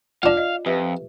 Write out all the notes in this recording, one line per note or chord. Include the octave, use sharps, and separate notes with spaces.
D4 F4 D5 F5 F#5
D#5
F2 G4 B4 E5